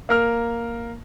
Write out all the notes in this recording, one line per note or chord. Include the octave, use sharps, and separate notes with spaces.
A#3 A#4 F6